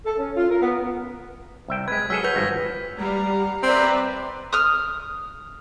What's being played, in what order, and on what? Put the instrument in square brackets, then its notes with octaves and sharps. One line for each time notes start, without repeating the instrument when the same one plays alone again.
[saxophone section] A4
C#4
F4
A#4
B3
[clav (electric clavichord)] C2 E5 G5
[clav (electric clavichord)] G#3 B4 [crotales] G#6 B6
[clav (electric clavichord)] F#3 G#4 A4 [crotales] E6 F6 B6
[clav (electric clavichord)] F#4 [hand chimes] B4 G6 [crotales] B6
[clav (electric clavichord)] G#1 G2 F3 [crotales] A#6
[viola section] G3 [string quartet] F5 F#5 A#5
[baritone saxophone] C4 [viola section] B4 D5 E5 [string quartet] A#5
[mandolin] D#6 F6